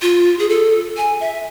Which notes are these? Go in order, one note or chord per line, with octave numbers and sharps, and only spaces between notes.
F4
G#4
A4
G#5
E5